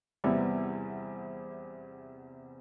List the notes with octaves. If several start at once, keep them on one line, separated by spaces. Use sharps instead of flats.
E2 C3 G3 B3 E4